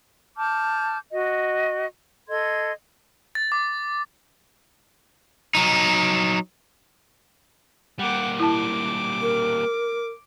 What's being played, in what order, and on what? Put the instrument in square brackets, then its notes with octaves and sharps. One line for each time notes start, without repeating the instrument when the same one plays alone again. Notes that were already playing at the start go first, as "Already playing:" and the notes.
[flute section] A5 D6 F6 G6
F#4 D#5
A4 D#5 C6 G#6
[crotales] A6
D6
[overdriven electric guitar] F#3 D#4
[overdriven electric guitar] G3 A#3 [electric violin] F#5 D6
[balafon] E4 A5 [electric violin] D6
[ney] A#4